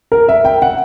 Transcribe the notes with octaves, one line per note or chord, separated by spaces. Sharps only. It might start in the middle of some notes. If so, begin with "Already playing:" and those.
A#4
E5
G5
F#5